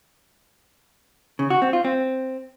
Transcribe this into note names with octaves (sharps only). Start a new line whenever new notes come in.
C#3
F#4
C4
F4
C4